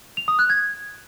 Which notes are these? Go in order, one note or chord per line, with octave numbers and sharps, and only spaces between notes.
F7
D#6
F#6
G#6